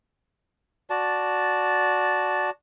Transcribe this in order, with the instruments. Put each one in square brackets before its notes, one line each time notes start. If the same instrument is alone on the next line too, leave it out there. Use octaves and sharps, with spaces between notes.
[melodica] F#4 D5 A5